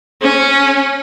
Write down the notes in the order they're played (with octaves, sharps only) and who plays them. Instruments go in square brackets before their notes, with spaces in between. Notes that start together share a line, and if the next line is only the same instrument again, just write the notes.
[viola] C#4